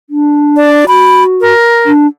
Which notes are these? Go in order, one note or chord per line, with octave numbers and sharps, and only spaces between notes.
D4
D5
F#4 B5
A#4
D4